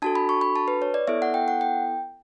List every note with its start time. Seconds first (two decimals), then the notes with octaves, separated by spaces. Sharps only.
0.02 D4 F#4 A4 A5
0.15 B5
0.29 C#6
0.41 B5
0.56 A5
0.68 B4
0.82 C#5
0.94 D5
1.07 B3 E4 A4 E5
1.22 F#5
1.34 G5
1.48 F#5
1.61 G5